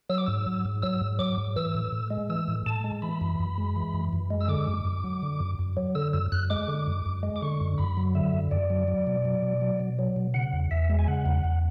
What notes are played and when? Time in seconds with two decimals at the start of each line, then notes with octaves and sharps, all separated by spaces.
0.10 F#3 E6
0.18 D6
0.26 G#2 E6
0.47 F#3
0.65 G#2
0.82 F#3 E6
1.01 G#2
1.19 F#3 D6
1.38 G#2
1.56 E3 E6
1.75 A2
1.92 A2
2.10 G#3
2.30 E3 E6
2.48 A2
2.66 A2 A5
2.84 G#3
3.02 E3 B5
3.21 F#2
3.39 F#2
3.58 G#3
3.76 E3
3.94 F#2
4.13 F#2
4.30 G#3
4.41 E6
4.48 D3 D6
4.68 F#2
4.85 F#2
5.04 F#3
5.22 D3
5.40 F#2
5.59 F#2
5.77 F#3
5.95 D3 E6
6.13 F#2 E6
6.32 F#2 F#6
6.50 G#3 D6
6.68 D3
6.87 F#2
7.06 F#2
7.23 G#3
7.36 D6
7.42 D3 C#6
7.61 F#2
7.78 F#2 B5
7.97 F#3
8.15 D3 E5
8.33 F#2
8.51 F#2 D5
8.70 F#3
8.88 F#3
9.07 B2
9.25 F#3
9.43 B2
9.61 F#3
9.80 B2
9.99 F#3
10.16 B2
10.34 C#3 F#5
10.53 E2
10.71 E2 E5
10.90 G#3
10.99 G#5
11.08 C#3 F#5
11.26 E2
11.44 E2